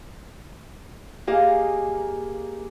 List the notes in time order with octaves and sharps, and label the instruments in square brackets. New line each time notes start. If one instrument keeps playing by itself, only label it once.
[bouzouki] A#3 D#5 F5 [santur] G4 G#4